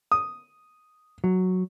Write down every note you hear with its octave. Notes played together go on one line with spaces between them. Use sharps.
D#6
F#3